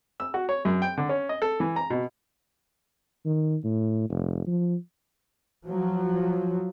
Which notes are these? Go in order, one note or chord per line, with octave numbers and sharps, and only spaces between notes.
E6
F#4
C#5
F#2
G5
D3
C#4
D#5
A4
E3
A#5
B2
D#3
A2
F1
F3
F3 F#3